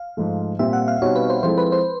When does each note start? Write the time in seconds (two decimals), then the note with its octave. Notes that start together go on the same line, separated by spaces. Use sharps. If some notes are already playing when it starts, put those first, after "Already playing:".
Already playing: F5
0.17 G#2 F3 A3
0.59 A#2 G3 C4 F4 E5
0.73 F#5
0.88 F5
1.02 B2 G3 C4 D#4 C#5
1.16 B4
1.30 C5
1.43 F3 G#3 C4 E4 A4 C5
1.58 B4
1.72 C5